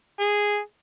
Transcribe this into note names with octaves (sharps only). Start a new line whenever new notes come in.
G#4